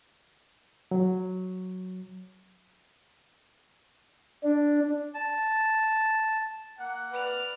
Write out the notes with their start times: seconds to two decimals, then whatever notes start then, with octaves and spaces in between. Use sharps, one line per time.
0.91 F#3
4.44 D4
5.14 A5
6.77 A#3 F#5
7.13 B4 D5 F6